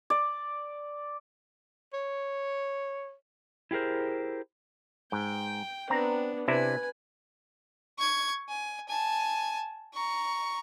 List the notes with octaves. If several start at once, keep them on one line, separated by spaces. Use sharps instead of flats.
D5
C#5
E4 G4 G#4 A#4 C5
G#2 G5
B3 C4 D4 A#5
C3 D4 E4 B4 G#5
C#6 G#6
G#5
G#5 A5
A#5 C#6